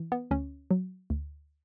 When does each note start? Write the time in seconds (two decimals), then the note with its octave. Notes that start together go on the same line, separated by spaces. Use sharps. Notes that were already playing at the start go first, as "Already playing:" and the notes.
Already playing: E3
0.12 B3
0.31 D2 C#4
0.71 F#3
1.10 D2